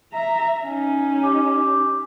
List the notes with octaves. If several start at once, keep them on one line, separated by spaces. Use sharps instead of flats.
E5 A#5
C#4 D#4
G4